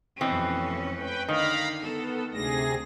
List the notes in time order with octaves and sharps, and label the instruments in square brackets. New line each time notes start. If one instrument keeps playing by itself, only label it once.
[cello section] F2 A3 C#4 [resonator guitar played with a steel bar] B2 E3 C4
[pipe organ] B4 G5
[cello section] D3 [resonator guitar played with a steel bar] D#3 [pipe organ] F5 A#5 B5
[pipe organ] B3 [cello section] A4
[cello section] D2 [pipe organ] C3 G#4 A#6